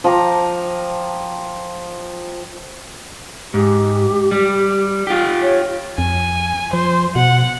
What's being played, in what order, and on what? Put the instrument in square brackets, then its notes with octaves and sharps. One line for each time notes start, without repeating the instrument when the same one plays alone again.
[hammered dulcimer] F3 G5 A#5 D6
[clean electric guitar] G#2 [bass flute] G4
[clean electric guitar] G3
F4 G4
[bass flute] C#5
[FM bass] F2 [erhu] G#5
[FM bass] F3 [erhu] C5
[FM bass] B2 [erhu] F#5